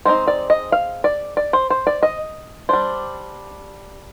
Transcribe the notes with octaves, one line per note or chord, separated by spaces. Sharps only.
G#3 C4 D#4 C5
D5
D#5
F5
D5
D5
C5
C5
D5
D#5
G3 D4 C5